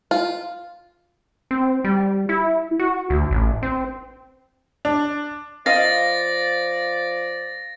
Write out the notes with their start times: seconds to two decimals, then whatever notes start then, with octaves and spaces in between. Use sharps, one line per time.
0.11 F4
1.51 C4
1.84 G3
2.29 E4
2.79 F#4
3.10 D2
3.31 A1
3.63 C4
4.85 D4
5.66 F3 D5 D#5 F5 A6 A#6